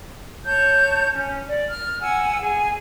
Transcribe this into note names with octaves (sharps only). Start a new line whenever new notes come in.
C#5 A5 G6
C#4
D5
F6
F#5 G#5 E6
G#4 G#5